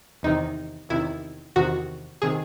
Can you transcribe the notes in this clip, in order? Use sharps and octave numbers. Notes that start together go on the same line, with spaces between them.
E2 C3 D#3 D#4
E2 C3 D#3 E4
E2 C3 D#3 F#4
C3 D#3 G#4